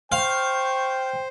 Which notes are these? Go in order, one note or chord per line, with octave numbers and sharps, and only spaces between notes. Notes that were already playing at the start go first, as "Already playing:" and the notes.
C5 F5 G5 C#6